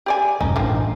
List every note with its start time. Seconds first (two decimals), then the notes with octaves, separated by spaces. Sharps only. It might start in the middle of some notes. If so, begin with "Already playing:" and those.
0.06 G4 D5 G#5
0.40 F1 B1 G2 C#4 D#4
0.56 A1 D#3 F3 D4